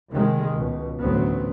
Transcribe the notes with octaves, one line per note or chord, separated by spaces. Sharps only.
C3 D#3 G#3
C#2 B2
A1 D2 F#3 B3 C4